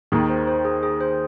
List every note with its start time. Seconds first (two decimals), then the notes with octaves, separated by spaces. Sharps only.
0.12 D#2 D#3 G#4
0.30 C5
0.47 C5
0.65 G#4
0.83 G#4
1.01 C5